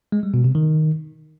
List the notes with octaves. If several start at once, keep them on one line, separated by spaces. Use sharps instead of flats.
G#3
G3
B2
C3
D#3